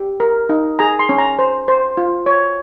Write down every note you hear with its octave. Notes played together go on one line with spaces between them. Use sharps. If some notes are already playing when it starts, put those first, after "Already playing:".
Already playing: G4
A#4
D#4
G#4 A#5
C6
C#4
A#5
C5
C5
F4
C#5